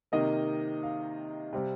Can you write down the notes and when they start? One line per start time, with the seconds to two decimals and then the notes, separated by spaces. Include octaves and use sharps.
0.12 C3 D#3 A#3 D#5
0.83 F5
1.53 C3 G3 C4